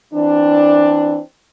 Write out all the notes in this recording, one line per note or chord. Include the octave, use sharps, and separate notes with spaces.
E3 C4 D4